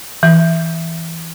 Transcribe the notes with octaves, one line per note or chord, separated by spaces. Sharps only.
E3